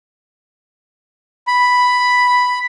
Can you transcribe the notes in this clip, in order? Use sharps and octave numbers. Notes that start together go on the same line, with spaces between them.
B5